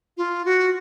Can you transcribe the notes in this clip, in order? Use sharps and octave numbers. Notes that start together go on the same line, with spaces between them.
F4
F#4